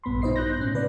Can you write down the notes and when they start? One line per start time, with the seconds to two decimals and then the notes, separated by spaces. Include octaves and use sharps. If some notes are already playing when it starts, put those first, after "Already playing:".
0.04 A#1 G2 B3 B5 C6
0.22 B2 D#4 C5 D#5 C7
0.36 F#6 G6 A#6
0.60 A2 C#4
0.74 C#3 B4 D5